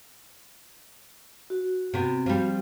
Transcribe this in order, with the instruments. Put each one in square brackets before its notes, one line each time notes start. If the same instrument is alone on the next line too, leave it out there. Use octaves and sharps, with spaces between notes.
[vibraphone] F#4
[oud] C3 B3
F3 G3